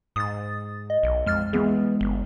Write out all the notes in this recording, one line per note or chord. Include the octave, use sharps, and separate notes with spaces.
G#2 D#6 A6
D#5
B1
F2 G#3 F6 A6
E3 G#3 B3 G#4
G1